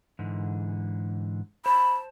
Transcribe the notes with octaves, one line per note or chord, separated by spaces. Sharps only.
G#2 D3 E3
C5 A5 B5